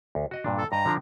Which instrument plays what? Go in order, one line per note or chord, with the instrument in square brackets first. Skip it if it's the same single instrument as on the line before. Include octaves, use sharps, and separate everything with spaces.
[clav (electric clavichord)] D2
F#4 D#5 F#5
G2 A#2 D4
[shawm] A4
[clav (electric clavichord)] G2 D#5 G5 [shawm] A#5
[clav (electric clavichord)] D3 F3 D4